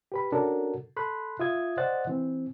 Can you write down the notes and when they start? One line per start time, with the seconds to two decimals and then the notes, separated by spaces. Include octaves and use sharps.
0.12 G4 B4 B5
0.32 C#4 D4 F#4 A4 A#4
0.96 A4 B5 C6 F#6
1.39 F4 E5 D#6 G#6
1.77 C5 D5 D#5 F#5 F#6 A6
2.07 E3 C4